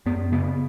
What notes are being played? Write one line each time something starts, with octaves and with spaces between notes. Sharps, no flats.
F#2 B3
C#3 B3